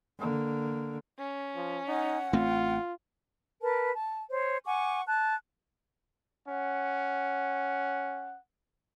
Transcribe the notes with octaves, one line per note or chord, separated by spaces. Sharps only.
D3 A#3
C#4
F3
D#4 F#5
A1 A3 C4 F4
A#4 B4 A5
A5
C5 C#5
F#5 G#5 C#6 D6
A5 F#6
C#4 F#5